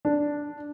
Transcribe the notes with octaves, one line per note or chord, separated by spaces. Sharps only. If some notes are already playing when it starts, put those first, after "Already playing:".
D4